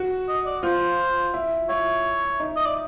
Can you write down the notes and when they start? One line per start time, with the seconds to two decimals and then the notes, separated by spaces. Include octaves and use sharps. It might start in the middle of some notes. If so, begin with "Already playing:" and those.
Already playing: F#4
0.28 D#5
0.46 D5
0.63 F4 C5
1.34 E4
1.69 E4 C#5
2.40 D#4
2.56 D#5
2.66 D5